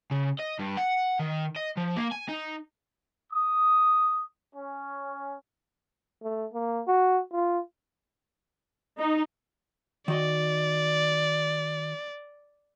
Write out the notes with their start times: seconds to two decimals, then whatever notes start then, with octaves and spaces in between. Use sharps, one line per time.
0.11 C#3
0.39 D#5
0.59 G2
0.78 F#5
1.20 D#3
1.56 D#5
1.77 F3
1.97 A#3
2.12 G#5
2.29 D#4
3.32 D#6
4.55 C#4
6.23 A3
6.54 A#3
6.87 F#4
7.32 F4
8.99 D#4
10.08 D#3 F#4 D5 D#5